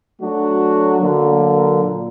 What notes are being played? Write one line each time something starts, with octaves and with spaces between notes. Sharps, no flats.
F#3 A3 D4 F#4
D3 F#3 A#3
A#2